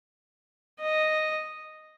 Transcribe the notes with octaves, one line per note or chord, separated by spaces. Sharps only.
D#5